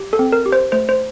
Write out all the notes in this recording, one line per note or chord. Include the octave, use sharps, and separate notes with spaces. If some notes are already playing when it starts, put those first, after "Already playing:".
Already playing: G4
A4
C4
A#4
G4
C5
A3 C5
C5